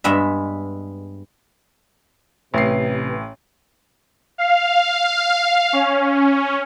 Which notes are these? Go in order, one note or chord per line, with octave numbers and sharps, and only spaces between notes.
G2 G#3 B3 E5
A1 C3 B4 C7
F5
C#4